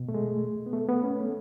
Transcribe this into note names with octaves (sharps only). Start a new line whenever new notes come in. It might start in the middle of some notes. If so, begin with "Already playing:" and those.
Already playing: B2
A3
G#3
B3
A3
B3
C#4
A3